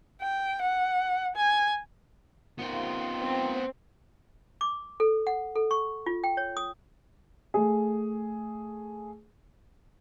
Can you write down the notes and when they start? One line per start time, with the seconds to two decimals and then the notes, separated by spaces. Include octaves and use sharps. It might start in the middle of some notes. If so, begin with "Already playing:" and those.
0.21 G5
0.62 F#5
1.36 G#5
2.59 C3 D#3 B3 F4 C5
3.20 C4
4.61 D6
5.00 A4
5.27 F#5
5.56 A4
5.71 C#6
6.06 F4
6.24 G5
6.37 C#5
6.57 D#6
7.54 A3 G#4